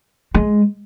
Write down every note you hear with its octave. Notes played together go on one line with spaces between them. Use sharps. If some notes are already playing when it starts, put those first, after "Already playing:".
G#3